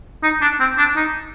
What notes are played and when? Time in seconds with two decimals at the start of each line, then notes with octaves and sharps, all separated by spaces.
0.23 D#4
0.41 D4
0.60 C4
0.78 D4
0.96 D#4